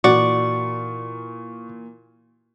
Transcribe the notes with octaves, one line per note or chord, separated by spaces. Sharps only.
A#2 E3 F#4 D5 C#6